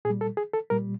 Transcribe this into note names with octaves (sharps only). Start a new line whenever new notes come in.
A#2 G#4
G3
A4
G#4
A4
A#2 G3 A#4